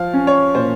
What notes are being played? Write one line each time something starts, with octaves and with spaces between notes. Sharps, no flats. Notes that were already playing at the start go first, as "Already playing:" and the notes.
Already playing: F3 F5
C#4
C#5
A#2 C5